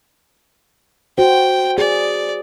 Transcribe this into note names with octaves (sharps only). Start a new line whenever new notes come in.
F#4 C5 G5
G#4 D5